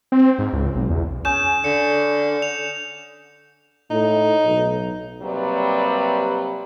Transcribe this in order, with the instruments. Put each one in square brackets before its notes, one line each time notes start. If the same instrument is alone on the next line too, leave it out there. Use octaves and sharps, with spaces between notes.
[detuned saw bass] C4
G#2
C#2
B1
E2
[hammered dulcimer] C#4 G#4 [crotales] G6 E7
[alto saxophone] D3 [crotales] C#7
[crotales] F7
[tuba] A2 [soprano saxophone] D#4
[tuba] B1
[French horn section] C3 F#3 G3 A#3 B4 D5